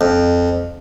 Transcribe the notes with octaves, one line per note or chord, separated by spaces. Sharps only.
F2